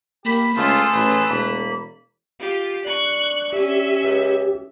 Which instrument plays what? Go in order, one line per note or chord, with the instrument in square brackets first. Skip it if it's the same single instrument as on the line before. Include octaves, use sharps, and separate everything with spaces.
[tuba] A#3 [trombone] G4 [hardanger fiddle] B5
[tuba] C#2 [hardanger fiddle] A3 [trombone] F4 [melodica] G#4 A4 C5
[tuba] A1 [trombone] B4
[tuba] E1 [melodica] A#3 B5
[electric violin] F4 G4
[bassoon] D4 [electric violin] C#6 F#6
[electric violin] C#4 E5 [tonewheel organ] G4
[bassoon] C#2